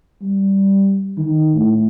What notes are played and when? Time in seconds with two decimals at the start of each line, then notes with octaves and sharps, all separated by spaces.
0.22 G3
1.18 D#3
1.54 A2